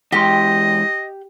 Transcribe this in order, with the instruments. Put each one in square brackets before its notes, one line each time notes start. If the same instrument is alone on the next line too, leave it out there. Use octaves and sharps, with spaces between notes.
[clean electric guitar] E3 G#3 C6 [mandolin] G4 [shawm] D#5